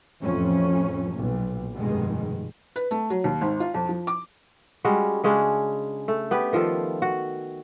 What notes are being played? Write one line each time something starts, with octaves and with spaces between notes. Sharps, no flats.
A1 F2 F3 C#4
B1 A#2
F1 G2 B2 D#3 G#3
B4
A3
F#3
D#2
G#1
F4
F2
F3
D6
G3 G#3 C#4 F#4
C#3 G#3 C#4 D4
A3
B3 G4 B4
D#3 F3 F4 A4
F#4